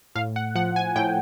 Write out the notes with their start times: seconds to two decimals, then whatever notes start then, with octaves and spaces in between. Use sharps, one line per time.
0.15 A2 F5
0.36 F#5
0.55 F3 F#5
0.76 G#5
0.96 A2 G5